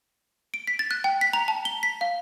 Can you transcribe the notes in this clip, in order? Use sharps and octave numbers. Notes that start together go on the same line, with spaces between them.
D7
B6
A6
F#6
G5
B6
A#5
A5
G7
B6
F5